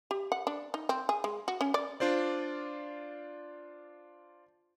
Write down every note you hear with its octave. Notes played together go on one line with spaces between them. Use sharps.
G4
F#5
D4
D#4
C4
G#4
G#3
F#4
C#4
D5
D4 F4 C5 D5